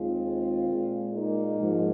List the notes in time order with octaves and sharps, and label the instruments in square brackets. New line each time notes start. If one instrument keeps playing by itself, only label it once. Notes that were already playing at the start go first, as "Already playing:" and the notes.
Already playing: [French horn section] D#2 D#3 G#3 C4 F4
A#2 G#3
A#3 D#4
G#2 F3 G#3